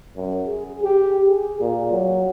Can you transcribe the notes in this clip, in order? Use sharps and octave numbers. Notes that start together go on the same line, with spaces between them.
F#2
G#4
G4
G#4
A#2
F#3